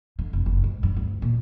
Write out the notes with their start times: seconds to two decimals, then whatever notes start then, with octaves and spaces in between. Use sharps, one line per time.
0.19 D3
0.33 F1
0.46 F#1
0.64 G#2
0.83 G2
0.96 D2
1.22 A#2